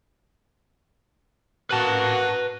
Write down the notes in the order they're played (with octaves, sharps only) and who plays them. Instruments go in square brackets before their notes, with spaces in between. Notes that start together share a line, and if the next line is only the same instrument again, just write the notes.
[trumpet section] A#3 F#4 [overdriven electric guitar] B4 A5